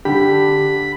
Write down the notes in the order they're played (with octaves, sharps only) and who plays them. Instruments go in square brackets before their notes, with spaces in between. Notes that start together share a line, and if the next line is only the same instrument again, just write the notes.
[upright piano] D3 [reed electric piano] G4 [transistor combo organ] B5